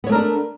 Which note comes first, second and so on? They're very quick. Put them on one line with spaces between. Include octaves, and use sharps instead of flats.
B3 C#5 A3 A#4 D4